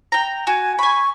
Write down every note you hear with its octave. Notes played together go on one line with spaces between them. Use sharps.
G5 A#5
F#4 G#5
G#5 B5 C#6